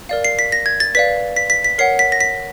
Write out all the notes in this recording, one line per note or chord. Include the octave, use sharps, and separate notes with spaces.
A#4 D5 F5
C7
B6
A#6
G#6
A6
B4 D5 F5 B6
B6
B6
B6
A#4 C#5 F#5 C7
B6
A#6
B6